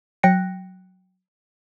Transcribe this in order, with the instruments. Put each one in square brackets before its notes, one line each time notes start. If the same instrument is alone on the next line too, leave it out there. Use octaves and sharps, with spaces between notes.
[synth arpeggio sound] F#3 G5 F#6 A#6 C#7